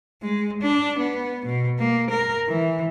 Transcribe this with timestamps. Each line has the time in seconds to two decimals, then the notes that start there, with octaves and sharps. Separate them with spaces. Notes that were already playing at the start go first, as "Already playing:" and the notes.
0.22 G#3
0.62 D4
0.99 B3
1.46 B2
1.79 A#3
2.10 A#4
2.48 E3